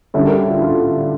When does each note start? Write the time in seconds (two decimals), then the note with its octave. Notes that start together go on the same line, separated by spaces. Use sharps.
0.14 D3 G3 C#4 E4 A4 C#5
0.26 G4 A#4
0.49 F4 A4
0.62 F4 A4